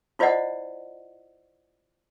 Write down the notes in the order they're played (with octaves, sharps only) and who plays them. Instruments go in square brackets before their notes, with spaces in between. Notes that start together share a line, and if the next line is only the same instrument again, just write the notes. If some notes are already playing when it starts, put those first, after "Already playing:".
[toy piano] E4 F4 C5 D5 D#5 F#5